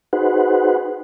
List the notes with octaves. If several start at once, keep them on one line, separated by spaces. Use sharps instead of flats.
D#4 F#4 G#4 B4 C5 F#5